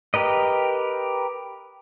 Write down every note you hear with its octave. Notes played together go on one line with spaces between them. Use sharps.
G4 A#4 B4 D#5